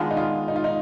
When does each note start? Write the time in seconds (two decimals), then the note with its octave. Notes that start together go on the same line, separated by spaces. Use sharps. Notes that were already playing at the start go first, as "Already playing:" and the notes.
Already playing: D#3 G#3 B3 D4 F4
0.11 D#4
0.17 F4
0.48 D#4
0.56 F4
0.64 D#4